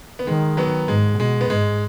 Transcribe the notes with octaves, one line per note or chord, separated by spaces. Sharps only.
B3
D#3 G#3
F#3 B3
G#2 G#3
B2 G#3
B3
G#2 G#3